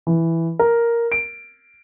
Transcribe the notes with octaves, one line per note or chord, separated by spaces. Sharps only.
E3
A#4
D7